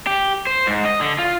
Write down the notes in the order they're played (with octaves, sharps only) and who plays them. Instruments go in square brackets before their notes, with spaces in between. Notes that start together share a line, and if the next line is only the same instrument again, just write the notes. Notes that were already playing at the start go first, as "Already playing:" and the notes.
[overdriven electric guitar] G4
C5
G#2
D#5
D3
F4